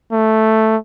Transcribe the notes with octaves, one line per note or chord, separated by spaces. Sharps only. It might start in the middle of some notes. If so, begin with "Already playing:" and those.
A3